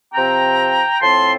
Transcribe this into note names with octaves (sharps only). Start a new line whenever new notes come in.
C3 F3 C4 G5 A#5
A2 F3 C4 A5 C6